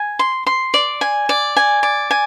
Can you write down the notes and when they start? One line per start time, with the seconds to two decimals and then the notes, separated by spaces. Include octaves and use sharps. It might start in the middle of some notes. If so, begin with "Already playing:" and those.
Already playing: G#5
0.19 C6
0.47 C6
0.74 D5
1.01 G#5
1.29 D5
1.56 G#5
1.83 D5
2.11 G#5